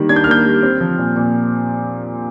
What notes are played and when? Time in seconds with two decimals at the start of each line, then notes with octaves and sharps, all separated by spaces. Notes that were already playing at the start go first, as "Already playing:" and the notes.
Already playing: D#3 G3 A#3
0.09 D4 G#6
0.16 G6
0.24 F6
0.27 A#3 G6
0.45 G3
0.63 C4
0.80 F3
0.98 A#2
1.16 A#2